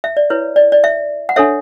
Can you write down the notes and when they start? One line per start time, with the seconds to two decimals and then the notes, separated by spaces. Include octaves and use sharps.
0.04 E5
0.17 D5
0.30 E4 B4 C#5
0.56 D5
0.72 D5
0.84 E5
1.29 F#5
1.36 D4 A4 C#5 E5